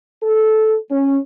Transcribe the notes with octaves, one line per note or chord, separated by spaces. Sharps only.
A4
C#4